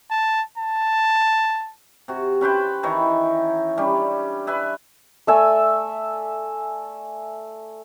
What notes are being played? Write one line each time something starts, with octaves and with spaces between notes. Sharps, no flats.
A5
A5
C3 F#4
C#4 B4 C5 G5
D#3 E3 C#5
G3 C#4 D4
B4 E5 G#5
A3 D5 E5 G#5